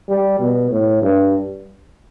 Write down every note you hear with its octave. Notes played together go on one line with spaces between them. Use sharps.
G3
B2
A2
G2